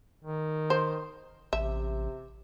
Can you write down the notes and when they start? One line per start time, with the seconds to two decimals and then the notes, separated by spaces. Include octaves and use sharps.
0.24 D#3
0.70 C5
1.53 A1 C3 E5